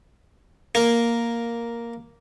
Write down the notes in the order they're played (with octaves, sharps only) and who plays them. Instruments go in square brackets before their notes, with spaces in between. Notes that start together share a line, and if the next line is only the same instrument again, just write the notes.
[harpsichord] A#3